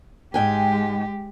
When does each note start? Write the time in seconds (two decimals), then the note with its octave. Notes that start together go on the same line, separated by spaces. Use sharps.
0.34 G#2 G#3 G4 G5 G#5